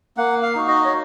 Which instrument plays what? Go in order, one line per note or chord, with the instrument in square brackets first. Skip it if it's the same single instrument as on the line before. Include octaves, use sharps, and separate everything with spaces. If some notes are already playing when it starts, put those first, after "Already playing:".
[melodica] A#3 F#5
F5
D#4 F#4
D#5
C#5